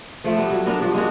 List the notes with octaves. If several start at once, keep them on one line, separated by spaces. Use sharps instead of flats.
F3 A3
G3 B3
F#3
B3 D4 A#4
G2 F3
G#3 A#3 D4 F#4